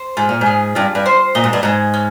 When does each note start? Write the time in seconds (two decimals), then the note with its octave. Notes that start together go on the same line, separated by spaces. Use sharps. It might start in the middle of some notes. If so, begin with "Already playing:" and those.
Already playing: C5
0.17 G#2 F4
0.29 A#2
0.41 G#2 G#4
0.75 G2 F4
0.95 G2
1.06 C5
1.35 A#2 D#5
1.44 G#2
1.53 G2
1.63 G#2 G#4
1.94 C#4